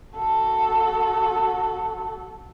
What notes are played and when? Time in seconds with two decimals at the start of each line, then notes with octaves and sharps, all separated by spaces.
0.14 F#4 A4